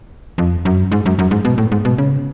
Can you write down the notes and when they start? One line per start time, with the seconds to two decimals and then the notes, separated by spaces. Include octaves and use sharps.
0.38 F2
0.65 F#2
0.92 G#2
1.06 F#2
1.19 F#2
1.31 G#2
1.45 B2
1.58 A2
1.72 G#2
1.85 B2
1.98 C#3